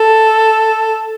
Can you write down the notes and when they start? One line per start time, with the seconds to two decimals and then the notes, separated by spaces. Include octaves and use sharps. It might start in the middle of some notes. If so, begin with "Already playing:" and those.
Already playing: A4